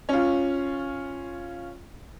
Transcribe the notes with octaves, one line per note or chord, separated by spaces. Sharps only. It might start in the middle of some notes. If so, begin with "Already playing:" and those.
C#4 F4